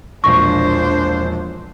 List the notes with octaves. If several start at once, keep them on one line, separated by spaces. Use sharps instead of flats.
E1 A#1 D4 C5 C#6 A#6